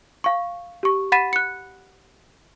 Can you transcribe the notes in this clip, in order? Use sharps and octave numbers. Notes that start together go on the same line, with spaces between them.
F5 C#6
G4 C#6
F#5 B5 A6 B6 D#7 E7
F#6 C#7